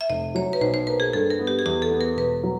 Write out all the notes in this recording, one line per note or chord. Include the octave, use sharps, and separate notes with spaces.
E5
F1 D#5
F#3 C#5
B4
B1 C5
C5
A#3 B4
G#4
G2 A4
A#4
B3
G4
G#4
E2 G4
A4
B3
A#4
E1 B4
F#3